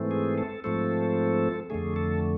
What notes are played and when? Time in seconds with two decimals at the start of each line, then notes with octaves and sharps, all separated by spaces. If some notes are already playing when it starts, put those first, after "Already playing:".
Already playing: G#2 E3 A3 C4
0.11 G#4
0.38 A4
0.64 G#2 F3 A3 C4 A4
1.70 F2 D3 A3 G#4
1.96 A4